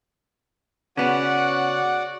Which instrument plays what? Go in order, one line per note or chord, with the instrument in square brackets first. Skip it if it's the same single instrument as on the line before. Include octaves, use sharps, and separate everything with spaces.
[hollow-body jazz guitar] C#3 B3 C#4 [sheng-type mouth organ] F#4 D5 F#5